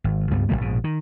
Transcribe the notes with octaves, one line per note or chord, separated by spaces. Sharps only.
G#1
C#2 G2 G3 B3
F1 G2 G#3 A#3
A#1 G#2 B2
D#3